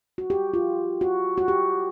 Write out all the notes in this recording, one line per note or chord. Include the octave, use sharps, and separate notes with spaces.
F#4
G4
F4
F#4
F#4
G4